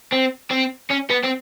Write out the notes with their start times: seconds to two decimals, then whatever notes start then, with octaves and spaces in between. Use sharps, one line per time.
0.12 C4
0.51 C4
0.91 C#4
1.10 B3
1.24 C4